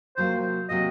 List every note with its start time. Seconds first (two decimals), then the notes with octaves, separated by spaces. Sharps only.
0.17 C3 F#3 A#3 F4 C5
0.69 C3 F#3 A#3 F4 D#5